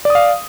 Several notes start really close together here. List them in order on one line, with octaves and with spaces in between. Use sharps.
D5 D#6 F5